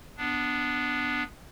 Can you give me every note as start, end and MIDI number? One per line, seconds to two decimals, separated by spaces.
0.17 1.23 59
0.17 1.23 62